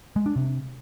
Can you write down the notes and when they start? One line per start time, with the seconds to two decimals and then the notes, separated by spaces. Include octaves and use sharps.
0.16 G#3
0.26 D4
0.36 C3